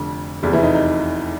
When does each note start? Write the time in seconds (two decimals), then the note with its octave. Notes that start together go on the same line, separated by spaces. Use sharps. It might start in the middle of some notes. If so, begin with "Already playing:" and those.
Already playing: F1 F2 D3
0.43 F1 E2 C3
0.53 E3 E4
0.63 D#4
0.74 D#4